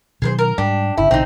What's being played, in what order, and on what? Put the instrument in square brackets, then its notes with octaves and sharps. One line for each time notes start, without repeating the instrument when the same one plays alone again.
[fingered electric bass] B2 D#3 F#3 [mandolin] G#4 A#4 C5
[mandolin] A#4
[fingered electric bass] G#2 G3 [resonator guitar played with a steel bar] D4 [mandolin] G4
[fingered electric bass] G1 C#3 [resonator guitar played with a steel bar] E4
[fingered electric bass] A#1 B2 D3 [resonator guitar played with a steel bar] C4 D#4